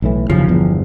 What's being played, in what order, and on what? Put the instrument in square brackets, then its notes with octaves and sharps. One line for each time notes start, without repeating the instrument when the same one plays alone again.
[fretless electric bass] B1 A2 E3
[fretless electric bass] F#1 D#2 C#3 [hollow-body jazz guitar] F3
[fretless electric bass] G1 E2